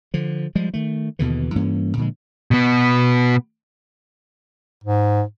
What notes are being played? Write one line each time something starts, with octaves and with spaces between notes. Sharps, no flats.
D3 F3
F3 G3 G#3
D#3 A3
D#2 B2 D3 E3
G2 E3 A#3 C#4
A#2 D3 F3 G#3
B2 B3
G#2